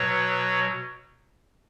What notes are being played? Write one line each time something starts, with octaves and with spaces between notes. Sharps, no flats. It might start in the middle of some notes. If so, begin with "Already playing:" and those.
Already playing: B2 F#3 B4 C#5